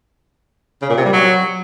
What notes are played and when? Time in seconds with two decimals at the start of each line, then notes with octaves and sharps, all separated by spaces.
0.82 C#3
0.90 A#2
0.97 C3
1.05 G3
1.13 F#3